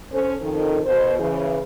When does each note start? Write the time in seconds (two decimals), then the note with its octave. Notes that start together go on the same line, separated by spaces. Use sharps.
0.12 C#4 A4 C5
0.42 F2 D#3 A4
0.86 B2 C5
1.19 C#3 E3 G#4